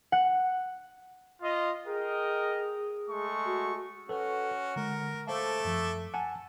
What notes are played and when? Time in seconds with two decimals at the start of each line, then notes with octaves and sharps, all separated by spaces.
0.12 F#5
1.42 F4 D#5
1.86 G#4 A#4 D#5 G5
3.10 G#3 A3 C#6
3.46 F#4
4.09 C#4 F#4 A4 B4
4.76 D3 G#3 A#4
5.28 A3 A4 C5 E5 F5 D6
5.65 F#2 F3
6.14 F#5 G#5 A5